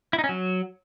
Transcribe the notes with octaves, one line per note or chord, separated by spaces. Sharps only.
E4
D#4
C#4
F#3